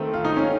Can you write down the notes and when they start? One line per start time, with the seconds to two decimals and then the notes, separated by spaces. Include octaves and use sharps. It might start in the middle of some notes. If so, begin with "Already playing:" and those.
Already playing: D#3 A3 C4
0.14 F4
0.25 D#4
0.37 C#4